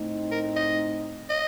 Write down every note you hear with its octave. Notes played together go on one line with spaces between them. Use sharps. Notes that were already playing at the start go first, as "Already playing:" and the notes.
Already playing: A2 A3 C4 D#4
A#4
D#5
D#5